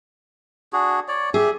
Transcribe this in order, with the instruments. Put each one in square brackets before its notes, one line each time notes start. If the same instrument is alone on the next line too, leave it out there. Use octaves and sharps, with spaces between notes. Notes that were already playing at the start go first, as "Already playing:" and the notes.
[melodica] D4 F#4 G#4
C#5 D5
[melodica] G4 E5 [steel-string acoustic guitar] G#4